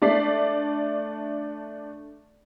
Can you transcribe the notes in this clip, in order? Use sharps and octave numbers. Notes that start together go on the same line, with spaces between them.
A3 D4 D5 B6 C7